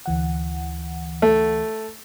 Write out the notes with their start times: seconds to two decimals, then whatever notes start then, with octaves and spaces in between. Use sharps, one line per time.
0.06 D2 E3 F#5
1.22 A3